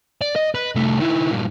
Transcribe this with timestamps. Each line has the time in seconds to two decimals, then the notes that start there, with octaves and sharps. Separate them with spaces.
0.21 D5
0.36 D#5
0.55 B4
0.75 C2 A3
0.99 D#3 E4
1.31 G2 A#2